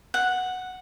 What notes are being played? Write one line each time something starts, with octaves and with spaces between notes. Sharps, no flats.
F#5